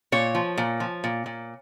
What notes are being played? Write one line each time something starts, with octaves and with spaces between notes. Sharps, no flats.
A#2 C#5
F3
A#2
F3
A#2
A#2